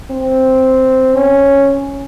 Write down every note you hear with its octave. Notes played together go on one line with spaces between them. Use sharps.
C4
C#4